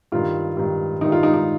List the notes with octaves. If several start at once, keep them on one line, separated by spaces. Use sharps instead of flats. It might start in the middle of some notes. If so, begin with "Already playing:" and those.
G2 D#3 F4
G2 D#3
G2 D#3 D#4
F4
D#4
D#4